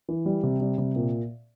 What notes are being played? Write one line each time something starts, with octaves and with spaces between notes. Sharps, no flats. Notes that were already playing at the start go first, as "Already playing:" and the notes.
E3
G3
C3
G3
C3
A#2